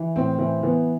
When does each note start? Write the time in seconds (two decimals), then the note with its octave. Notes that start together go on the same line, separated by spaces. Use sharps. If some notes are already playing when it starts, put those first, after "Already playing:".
Already playing: E3
0.16 A2 C4
0.39 E3 C4
0.63 E3 B3